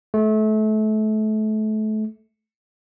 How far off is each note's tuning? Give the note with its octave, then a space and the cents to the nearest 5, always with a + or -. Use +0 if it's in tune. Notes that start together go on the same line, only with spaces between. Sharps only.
A3 -30